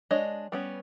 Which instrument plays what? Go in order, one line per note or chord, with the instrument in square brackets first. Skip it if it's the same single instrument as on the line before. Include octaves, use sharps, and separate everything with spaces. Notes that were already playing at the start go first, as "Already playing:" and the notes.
[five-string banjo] G#3 D4 C#5 D#5
G3 B3 C#4